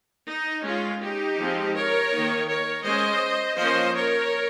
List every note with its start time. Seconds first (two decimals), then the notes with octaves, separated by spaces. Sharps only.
0.29 D#4
0.65 G#3 C#4 F4
1.02 D#4 G4
1.38 F3 G#3 C4
1.75 A#4 C#5
2.12 D#3 A#3 D#4
2.48 A#4 C#5
2.85 G#3 C#4 C5 D#5
3.58 F3 A#3 C#4 C5 D#5
3.95 A#4 C#5